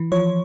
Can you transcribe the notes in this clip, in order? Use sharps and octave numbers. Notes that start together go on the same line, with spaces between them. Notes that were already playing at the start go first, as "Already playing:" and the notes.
Already playing: E3
F3 C#5